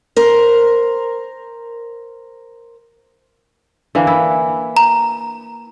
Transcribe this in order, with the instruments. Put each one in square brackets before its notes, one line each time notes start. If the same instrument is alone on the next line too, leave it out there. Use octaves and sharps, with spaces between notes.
[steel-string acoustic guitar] A#4 C5
[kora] D3 E3 A#3
E4
[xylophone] A#5